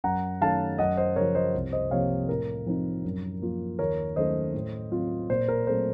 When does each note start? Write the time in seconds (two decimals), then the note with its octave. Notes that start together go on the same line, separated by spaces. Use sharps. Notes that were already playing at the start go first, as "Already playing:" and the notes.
0.04 F#2 F#5 A#5
0.41 D#3 F#3 A3 C#4 F5 A5
0.78 F#2 D#5 F#5
0.97 C5 D#5
1.16 C#3 F3 A#4 C#5
1.35 C5 D#5
1.54 C2
1.72 C5 D#5
1.91 C3 F3 A#3 C#5 F5
2.29 A2 A#4
2.66 F3 C4 D#4
3.05 F#2
3.41 F3 A#3 F4
3.79 D#2 A#4 C#5
4.16 D#3 F#3 A3 C#4 C5 D#5
4.54 A2
4.91 F#3 C4 F4
5.30 A#2 C5
5.48 A#4
5.67 F#3 A3 C4 C5